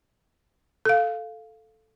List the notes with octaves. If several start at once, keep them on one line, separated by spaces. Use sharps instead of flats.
A4 F5